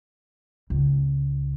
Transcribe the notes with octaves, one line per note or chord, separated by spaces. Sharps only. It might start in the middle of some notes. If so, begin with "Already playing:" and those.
C#2